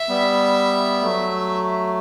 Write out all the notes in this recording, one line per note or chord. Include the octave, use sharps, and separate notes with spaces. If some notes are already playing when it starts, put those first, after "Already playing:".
Already playing: E5
G3 B3
F#3 A3